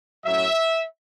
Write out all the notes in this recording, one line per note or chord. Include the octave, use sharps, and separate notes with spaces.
A2 F#3 C#4 E5